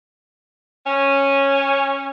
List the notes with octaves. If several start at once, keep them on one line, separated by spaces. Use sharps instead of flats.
C#4